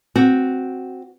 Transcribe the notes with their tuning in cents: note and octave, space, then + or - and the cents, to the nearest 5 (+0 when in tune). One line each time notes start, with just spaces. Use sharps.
C4 +0 F#4 +0